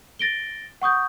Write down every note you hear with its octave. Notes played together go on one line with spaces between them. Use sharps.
A6 A#6 D7 G7
F#5 C#6 D#6 G6